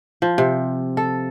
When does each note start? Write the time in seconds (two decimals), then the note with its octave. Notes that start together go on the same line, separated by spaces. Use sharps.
0.22 F3
0.38 C3
0.97 A4